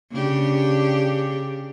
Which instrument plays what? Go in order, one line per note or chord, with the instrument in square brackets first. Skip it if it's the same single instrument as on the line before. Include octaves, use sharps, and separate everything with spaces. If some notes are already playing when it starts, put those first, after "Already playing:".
[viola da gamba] C#3 D4 G4